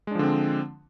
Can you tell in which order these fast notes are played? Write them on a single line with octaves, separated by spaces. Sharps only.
G#3 D4 F3 D3 C4